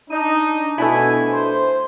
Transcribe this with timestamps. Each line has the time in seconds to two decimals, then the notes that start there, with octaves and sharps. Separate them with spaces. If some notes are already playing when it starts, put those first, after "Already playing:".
0.10 D4 D#4 D#7
0.78 B2 A3 D4 E4 G#5
1.31 C5